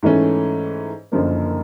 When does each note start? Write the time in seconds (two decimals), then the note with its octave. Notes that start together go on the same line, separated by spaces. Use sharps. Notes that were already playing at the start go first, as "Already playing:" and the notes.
0.03 G#2 E3 A3 C#4
1.12 F#1 F#2 D3 F3 A#3